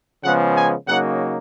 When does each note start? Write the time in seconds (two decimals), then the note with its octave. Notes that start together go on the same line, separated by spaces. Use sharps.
0.25 C#3 F3 G#3 B3 F#5
0.56 G#5
0.87 C#3 F#3 A#3 D#4 F#5